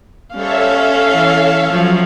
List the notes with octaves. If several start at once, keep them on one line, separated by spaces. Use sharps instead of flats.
G3 C#4 A4 C5 C#5 E5 F5
E3
F3 F#3 C#5